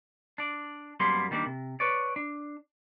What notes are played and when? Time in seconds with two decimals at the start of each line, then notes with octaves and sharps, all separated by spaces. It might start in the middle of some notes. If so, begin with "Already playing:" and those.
0.38 D4 D5
1.00 F#2 G3 A#3 B3 C6
1.31 D#3 G3 A#3 D4
1.46 C3
1.80 B4 C#5 D5
2.16 D4